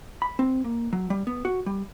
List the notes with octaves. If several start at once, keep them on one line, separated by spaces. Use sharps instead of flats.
B5
C4
A#3
F#3
G3
B3
F#4
G3